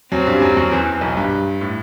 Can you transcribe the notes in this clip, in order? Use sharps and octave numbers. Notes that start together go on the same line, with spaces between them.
F#2 F#3 C4
G2 G3
F#2 F#3
F#2 F#3
E2 E3
B1 B2
G2
A2